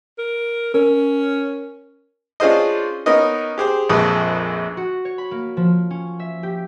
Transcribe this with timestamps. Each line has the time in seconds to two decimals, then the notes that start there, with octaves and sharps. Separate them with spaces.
0.19 A#4
0.74 C#4 A#4
2.40 C#4 D4 F4 G#4 C5 D#5
3.06 B3 C#4 D#4 A#4 D#5
3.58 G4 G#4 C5
3.89 A#1 F2 G#3 B4 C#6 D#6
4.77 F#4
5.05 C#5
5.18 B5
5.31 A#3
5.57 F3
5.90 C#4
6.19 E5
6.43 G4